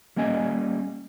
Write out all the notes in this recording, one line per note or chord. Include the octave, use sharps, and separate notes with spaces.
G3 A#3 C#4 D#5 G#5